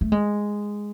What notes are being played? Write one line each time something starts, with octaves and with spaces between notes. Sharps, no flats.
A3
G#3